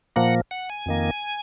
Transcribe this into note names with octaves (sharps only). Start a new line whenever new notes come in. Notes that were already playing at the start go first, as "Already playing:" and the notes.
A#2 F3 A#3 F#5
F#5
G#5
F2 D#3 A#3